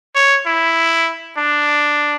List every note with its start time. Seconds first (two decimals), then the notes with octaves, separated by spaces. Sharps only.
0.15 C#5
0.46 E4
1.38 D4